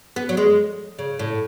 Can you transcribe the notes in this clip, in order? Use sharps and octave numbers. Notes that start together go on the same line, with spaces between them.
B3
F#3
G#3
C#3
A2